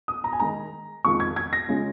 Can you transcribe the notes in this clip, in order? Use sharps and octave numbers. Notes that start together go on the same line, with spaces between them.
D#6
A#5
G#5
D#3 G#3 D#4 A#5
F2 D#3 G#3 F4 C#6
G#6
G#6
A#6
C#3 G#3 C#4 F4